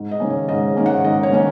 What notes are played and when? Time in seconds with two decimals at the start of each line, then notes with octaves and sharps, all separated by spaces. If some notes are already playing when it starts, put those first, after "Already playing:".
Already playing: G#2
0.11 D#5
0.20 D#3 A#3 C#4
0.30 C#5
0.48 G#2 D#5
0.68 C#5
0.76 D#3 A#3 C#4
0.86 F#5
1.04 G#2 D#5
1.23 C#5
1.32 D#3 A#3 C#4